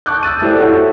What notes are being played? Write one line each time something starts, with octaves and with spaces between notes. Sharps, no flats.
A5 C#6 D6 F#6 G6
E6 F#6 A6 D#7
A3 E4 G4 A4 C5 D5
E4 F#4 A4 C#5 F#5